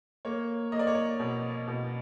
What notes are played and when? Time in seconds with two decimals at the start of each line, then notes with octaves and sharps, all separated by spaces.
0.25 A#3 C#5
0.72 A#3 D#5
0.79 D5
0.87 C#5
0.95 D5
1.20 B2
1.68 B2